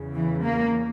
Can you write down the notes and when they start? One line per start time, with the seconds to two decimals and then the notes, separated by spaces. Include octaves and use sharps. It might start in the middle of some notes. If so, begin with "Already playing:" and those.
Already playing: E2 C#3
0.14 E3
0.43 A#3